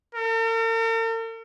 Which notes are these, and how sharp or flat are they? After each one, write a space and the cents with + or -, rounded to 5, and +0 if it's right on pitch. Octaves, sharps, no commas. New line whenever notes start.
A#4 -45